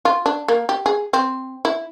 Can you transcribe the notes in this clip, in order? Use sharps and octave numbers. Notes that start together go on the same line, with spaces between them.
F4
D4
A#3
G4
G#4
C4
E4